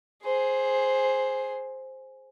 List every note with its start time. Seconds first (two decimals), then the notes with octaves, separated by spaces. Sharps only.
0.24 G#4 C5